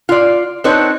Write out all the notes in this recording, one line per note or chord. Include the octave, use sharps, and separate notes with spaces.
F4 D5
C4 D4 D#4 B4 C#5